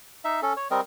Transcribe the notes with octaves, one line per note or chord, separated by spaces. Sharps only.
D#4 E5
C#4 A4
C#5
G3 C4 A#4 D#5